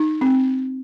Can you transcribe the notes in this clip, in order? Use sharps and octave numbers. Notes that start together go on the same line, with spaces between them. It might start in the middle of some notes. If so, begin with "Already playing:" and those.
Already playing: D#4
C4